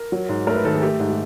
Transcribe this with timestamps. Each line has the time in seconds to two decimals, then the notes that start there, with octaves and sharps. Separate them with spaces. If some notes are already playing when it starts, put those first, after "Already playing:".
Already playing: A#4
0.12 F#3
0.29 G#2
0.47 A3 A#4
0.56 B4
0.65 D#3 A4
0.74 G#4
0.82 A3 G4
1.00 G#2
1.10 G4